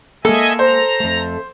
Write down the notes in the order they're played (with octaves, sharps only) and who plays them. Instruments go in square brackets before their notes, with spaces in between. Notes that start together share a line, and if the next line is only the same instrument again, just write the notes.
[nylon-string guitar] G#3 A#3 [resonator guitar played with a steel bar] A4 [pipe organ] D#5 E5 G#5
[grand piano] C5 [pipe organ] A#5
[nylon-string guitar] F2 A3